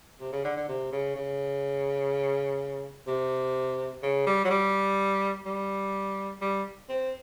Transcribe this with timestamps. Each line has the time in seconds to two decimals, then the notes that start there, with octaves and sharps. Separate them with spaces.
0.20 C3
0.32 C#3
0.44 D3
0.56 D3
0.68 C3
0.92 C#3
1.16 C#3
3.07 C3
4.03 C#3
4.27 G3
4.44 F#3
4.50 G3
5.46 G3
6.41 G3
6.89 C4